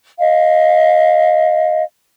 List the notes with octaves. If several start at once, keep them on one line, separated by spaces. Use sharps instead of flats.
D#5 F5